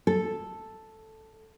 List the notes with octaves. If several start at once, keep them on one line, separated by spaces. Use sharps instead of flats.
A4